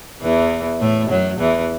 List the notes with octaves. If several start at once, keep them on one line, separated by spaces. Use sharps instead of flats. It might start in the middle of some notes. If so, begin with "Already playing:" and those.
E2 E3
A2 A3
F#2 F#3
E2 E3